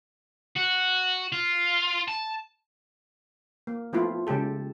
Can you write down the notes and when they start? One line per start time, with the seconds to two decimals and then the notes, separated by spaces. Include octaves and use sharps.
0.56 F#4
1.32 F4
2.08 A5
3.67 A#3
3.93 F3 A3 B3 C4 E4 F4
4.27 C#3 G#3 G4 A4